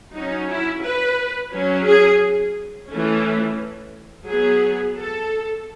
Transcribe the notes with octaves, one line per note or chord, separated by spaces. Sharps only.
F#3 C#4 D#4
E4
B4
F#3 C#4
G#4
E3 A3 C#4
F#3 B3 G#4
A4